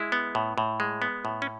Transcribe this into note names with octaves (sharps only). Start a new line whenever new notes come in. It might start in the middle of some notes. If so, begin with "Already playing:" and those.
Already playing: G#3 E4
B3
A2
A2
G#3
B3
A2
C#4